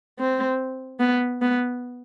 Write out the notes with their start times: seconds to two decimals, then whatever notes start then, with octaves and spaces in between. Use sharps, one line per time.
0.19 C4
1.00 B3
1.41 B3